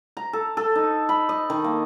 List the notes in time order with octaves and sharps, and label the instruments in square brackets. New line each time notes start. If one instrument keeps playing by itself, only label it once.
[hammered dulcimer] A#5
A4
A4
D#4
B5
D#5
D#3
A#3